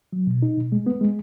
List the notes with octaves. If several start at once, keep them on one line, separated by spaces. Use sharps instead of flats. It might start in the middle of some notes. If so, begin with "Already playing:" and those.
F#3
B2
D#4
B2
G#3
B3
G#3